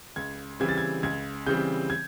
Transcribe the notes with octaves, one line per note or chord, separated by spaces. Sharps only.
C#2 G#6
C#3 E3 G3 C4 G#6
A6
G#6
C#2 G#6
C#3 E3 G3 C4 G6
G#6